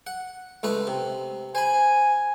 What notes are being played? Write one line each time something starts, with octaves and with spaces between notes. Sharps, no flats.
F#5
C#2 A3 B4
C3
C5 G#5 B5